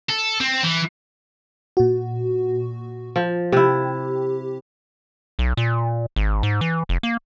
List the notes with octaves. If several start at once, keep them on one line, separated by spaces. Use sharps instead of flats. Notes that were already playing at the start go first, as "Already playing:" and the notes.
A4
C4
E3
A#2 F#4
F3
C3 E4 G4
B1
A#2
G#1
G#2
E3
F1
A#3